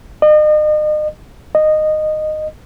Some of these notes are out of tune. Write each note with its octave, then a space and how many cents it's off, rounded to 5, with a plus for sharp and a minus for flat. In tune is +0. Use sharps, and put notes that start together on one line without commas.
D#5 -40
D#5 -15